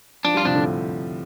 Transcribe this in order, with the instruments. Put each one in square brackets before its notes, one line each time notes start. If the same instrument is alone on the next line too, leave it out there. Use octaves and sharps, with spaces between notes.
[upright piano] F3 [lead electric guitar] D4
[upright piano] G3 [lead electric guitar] F4
[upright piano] C3 F3 [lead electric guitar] D4
[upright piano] A2 D3